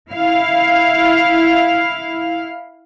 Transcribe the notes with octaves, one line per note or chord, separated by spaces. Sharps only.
E4 F5